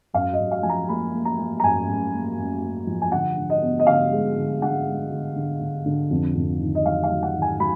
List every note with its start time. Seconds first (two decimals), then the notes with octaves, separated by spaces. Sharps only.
0.14 F#2 F5
0.33 D#5
0.39 F#2
0.51 F5
0.63 F3 G#5
0.69 A#5
0.89 A#3 B5
1.14 A#3
1.25 A#5
1.38 A#3
1.60 A#5
1.63 F#2 G#5
1.88 F#2
2.13 A#3
2.38 F#2
2.62 A#3
2.87 F3
3.02 G#5
3.12 D3 F#5
3.37 D3
3.50 D#5
3.62 B3
3.79 D#5
3.87 D3 F5
4.12 G#3
4.37 D3
4.62 D3 F#5
4.87 G#3
5.11 D3
5.36 D3
5.60 D3
5.86 D3
6.11 F2
6.35 F2
6.60 D#3
6.75 D#5
6.86 F#3 F5
7.03 F5
7.11 F#3
7.23 F#5
7.35 D#3
7.42 G#5
7.60 F#3 B5